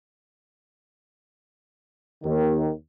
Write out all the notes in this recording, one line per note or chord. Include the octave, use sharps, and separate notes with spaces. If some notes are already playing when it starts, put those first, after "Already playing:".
D#2 D#3